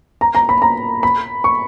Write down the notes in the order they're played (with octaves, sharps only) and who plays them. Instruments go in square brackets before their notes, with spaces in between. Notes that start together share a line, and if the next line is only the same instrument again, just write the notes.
[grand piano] A#5
A#5
B5
A#5
B5
C#6